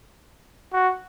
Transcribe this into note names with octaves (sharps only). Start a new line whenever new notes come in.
F#4